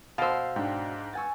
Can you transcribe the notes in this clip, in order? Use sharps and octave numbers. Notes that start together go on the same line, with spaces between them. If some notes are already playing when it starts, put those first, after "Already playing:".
B2 C5 F5 E6
G#2 D4 G5
F#5 G#5 C#6 E6 A6